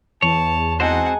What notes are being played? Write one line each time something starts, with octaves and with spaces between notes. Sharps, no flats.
E2 C#5 A5
G#3 C4 D#4 F#4 C5 F#5 G#5 A5